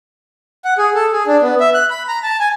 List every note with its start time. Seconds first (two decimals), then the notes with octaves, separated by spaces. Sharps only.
0.65 F#5
0.78 G#4
0.95 A4
1.12 G#4
1.27 D4
1.42 B3
1.60 E5
1.74 F#6
1.90 B5
2.08 A#5
2.23 A5
2.40 G#5